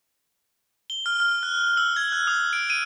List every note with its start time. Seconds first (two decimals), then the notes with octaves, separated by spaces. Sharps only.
0.90 G7
1.06 F6
1.20 F6
1.43 F#6
1.77 E6
1.96 G#6
2.12 F#6
2.27 D#6
2.53 D7
2.70 D#7